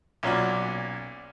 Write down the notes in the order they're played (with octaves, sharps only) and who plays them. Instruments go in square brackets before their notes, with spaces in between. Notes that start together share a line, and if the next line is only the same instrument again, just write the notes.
[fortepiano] B1 A#2 C#4 F#4 D5